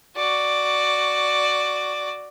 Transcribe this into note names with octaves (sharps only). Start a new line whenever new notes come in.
F#4 D5